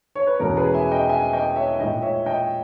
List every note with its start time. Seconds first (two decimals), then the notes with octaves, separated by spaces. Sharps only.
0.15 C#5
0.27 B4
0.39 E2 B2 G#3 C#4 A#4
0.57 G#4 B4
0.74 E5 G#5
0.91 D#5 G5
1.09 E5 G#5
1.33 D#5 G5
1.56 C#5 E5
1.79 A#2 G#3 D#4 D#5 G5
2.02 C#5 E5
2.26 D#5 G5